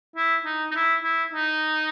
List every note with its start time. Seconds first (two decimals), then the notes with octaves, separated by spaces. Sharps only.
0.16 E4
0.45 D#4
0.71 D#4
0.75 E4
1.03 E4
1.33 D#4